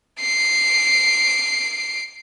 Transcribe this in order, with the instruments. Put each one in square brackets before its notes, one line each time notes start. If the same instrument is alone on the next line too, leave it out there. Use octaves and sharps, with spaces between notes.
[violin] C7 D7